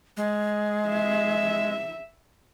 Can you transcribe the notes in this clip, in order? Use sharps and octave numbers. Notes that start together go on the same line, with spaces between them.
G#3
E5